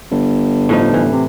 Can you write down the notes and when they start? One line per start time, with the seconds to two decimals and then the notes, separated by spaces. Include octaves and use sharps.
0.11 G1
0.69 A2 F3 D#4
0.94 E3
1.12 C3